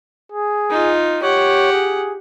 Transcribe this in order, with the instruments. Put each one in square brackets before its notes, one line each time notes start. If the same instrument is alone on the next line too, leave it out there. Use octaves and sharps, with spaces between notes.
[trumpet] G#4
[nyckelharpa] D#4 F4
[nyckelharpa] G4 F#5 [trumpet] C#5
[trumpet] G#4